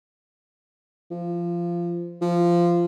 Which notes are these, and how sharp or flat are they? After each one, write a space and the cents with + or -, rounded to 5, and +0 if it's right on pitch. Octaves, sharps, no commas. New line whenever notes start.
F3 -20
F3 -15